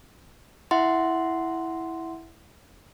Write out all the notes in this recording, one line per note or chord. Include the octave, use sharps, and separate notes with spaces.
E4 E5 F#5 C6